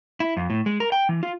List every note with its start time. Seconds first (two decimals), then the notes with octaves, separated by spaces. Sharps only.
0.20 E4
0.37 F2
0.50 A2
0.66 G#3
0.80 A#4
0.92 G5
1.09 E3
1.23 F4